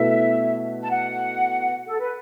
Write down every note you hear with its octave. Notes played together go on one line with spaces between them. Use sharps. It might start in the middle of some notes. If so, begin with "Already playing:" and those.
Already playing: B2 A3 E4 B4 E5
A5
F#5
A4
B4